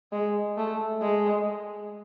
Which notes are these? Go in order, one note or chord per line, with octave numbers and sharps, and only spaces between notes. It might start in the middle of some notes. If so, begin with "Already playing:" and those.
G#3
A3
G#3